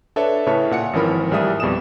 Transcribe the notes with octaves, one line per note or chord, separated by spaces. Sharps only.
D4 A4 B4 C#5 D5 E5
A2 C#3 B4 C#5 E5 A5
A#2 F#5 C#7
G#1 E3 F3 C#4 A#4 B5
A1 G3 G#4 E5 D#6
F2 B2 G3 G#4 D#6 E7